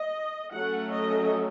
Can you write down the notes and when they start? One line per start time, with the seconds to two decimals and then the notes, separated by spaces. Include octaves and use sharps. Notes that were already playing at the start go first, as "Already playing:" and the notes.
Already playing: D#5
0.53 F#3 A3 C#4 F#5
0.93 D#5